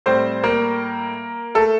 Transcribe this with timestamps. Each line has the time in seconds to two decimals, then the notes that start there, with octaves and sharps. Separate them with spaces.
0.06 A2 G3 C4 C5
0.43 A#3 A#4
1.55 A3 A4